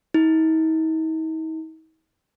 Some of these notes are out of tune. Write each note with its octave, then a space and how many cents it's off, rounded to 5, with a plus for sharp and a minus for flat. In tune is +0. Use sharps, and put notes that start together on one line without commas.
D#4 +45